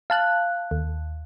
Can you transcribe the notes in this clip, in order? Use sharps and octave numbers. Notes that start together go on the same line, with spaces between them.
F5 A5 F#6
D#2